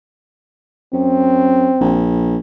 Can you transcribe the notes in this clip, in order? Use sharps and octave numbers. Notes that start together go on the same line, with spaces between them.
F#2 C4
A#1